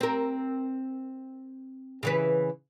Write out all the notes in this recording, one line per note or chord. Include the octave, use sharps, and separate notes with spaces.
C4 A#4
C#3 E3 B4